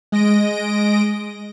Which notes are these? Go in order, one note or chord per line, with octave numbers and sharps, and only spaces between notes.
G#3 D#5 A#6 D7